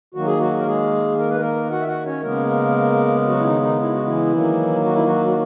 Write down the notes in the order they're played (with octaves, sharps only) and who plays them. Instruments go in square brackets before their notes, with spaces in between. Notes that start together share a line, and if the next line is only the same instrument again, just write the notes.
[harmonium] D#3 F#3 A#3 F#4
G#4
F#3 F#4
A#4
G#3 G#4
A#4
B4
A#3 A#4
F#4 F#5
E5
F#4 F#5
C#4 C#5
C#3 G#3 A#3 B3 A#4
F#3 F#4
E4
D#3 D#4
D#3 D#4
E4
F#4
E3 E4
D#3 F#3 A#3
F#4
E4
F#3 F#4
F#4